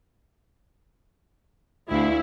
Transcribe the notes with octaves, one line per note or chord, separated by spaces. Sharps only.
D2 E4 F5